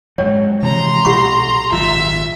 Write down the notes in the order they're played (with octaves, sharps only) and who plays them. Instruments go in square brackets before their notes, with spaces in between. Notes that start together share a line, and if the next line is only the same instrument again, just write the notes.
[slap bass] G#2 F#3 [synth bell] G#3 [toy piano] C#5
[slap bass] C3 E3 F3 [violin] A#5 C6
[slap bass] B1 A#2 [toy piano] G4 B5 C#6 [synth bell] F#5 C7
[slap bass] G#1 A#2 F#3 [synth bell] F4 [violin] E5